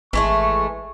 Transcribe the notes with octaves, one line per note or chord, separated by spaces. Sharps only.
G#1 E3 G#3 A3 C#6